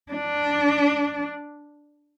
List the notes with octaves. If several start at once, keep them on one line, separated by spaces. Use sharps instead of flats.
D4